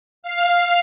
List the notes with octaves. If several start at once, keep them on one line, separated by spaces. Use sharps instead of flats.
F5